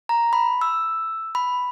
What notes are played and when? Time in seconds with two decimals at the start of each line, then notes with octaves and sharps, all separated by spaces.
0.09 A#5
0.33 B5
0.61 E6
1.35 B5